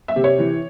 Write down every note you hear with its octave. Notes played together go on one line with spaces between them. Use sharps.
E5
C3
C#5
E3